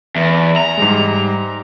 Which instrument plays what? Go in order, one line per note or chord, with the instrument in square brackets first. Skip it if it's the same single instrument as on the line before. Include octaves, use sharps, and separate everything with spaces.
[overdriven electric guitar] E2
A#5
[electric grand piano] G#2 G3 G#3